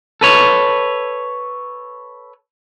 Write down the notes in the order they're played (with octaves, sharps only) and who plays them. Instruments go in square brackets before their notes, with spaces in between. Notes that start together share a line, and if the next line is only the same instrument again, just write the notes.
[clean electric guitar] A4 B4 C#5